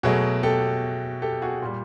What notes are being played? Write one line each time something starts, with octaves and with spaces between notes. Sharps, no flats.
B2 F#3 A3 F#4 G#4
G4 A4
G4 A4
F#4 G#4
A#2 G3